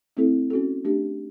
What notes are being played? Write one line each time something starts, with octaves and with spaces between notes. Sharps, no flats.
A3 C4 E4 A4
C#4 F#4 A4
A3 D4 G4